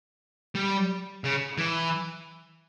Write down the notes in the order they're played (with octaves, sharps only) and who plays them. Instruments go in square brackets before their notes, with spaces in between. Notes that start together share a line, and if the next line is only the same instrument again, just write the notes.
[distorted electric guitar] G3
C#3
E3